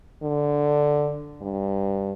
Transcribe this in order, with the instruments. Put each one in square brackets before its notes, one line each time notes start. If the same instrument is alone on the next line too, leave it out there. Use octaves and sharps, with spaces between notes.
[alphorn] D3
G2